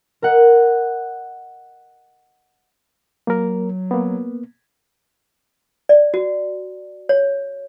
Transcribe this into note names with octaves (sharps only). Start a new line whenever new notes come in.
A#4 D#5 F#5
F#3 A#3 A#4
A#3 B3
D5
F#4
C#5